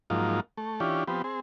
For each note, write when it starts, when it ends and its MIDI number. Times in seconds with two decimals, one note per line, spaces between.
0.10 0.40 44
0.10 0.40 53
0.10 0.40 54
0.10 0.40 58
0.10 0.40 63
0.10 0.40 65
0.57 0.80 57
0.80 1.04 52
0.80 1.04 61
0.80 1.04 62
0.80 1.04 65
0.80 1.04 67
1.08 1.22 53
1.08 1.22 59
1.08 1.22 60
1.08 1.22 67
1.24 1.40 60
1.24 1.40 68